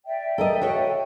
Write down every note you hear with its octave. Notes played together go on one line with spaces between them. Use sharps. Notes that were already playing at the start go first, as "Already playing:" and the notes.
D5 E5 G5
A4 A#4 D#5
F#4 A4 C#5